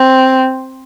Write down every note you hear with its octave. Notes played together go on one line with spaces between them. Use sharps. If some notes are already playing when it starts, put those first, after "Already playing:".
Already playing: C4